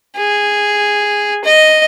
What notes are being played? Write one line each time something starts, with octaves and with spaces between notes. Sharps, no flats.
G#4
D#5